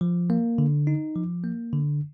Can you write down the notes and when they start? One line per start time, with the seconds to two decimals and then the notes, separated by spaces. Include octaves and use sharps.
0.01 F3
0.30 A#3
0.58 D3
0.87 D#4
1.16 F3
1.44 A#3
1.73 D3